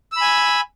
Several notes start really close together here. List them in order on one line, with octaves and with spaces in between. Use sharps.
E6 B5 G#5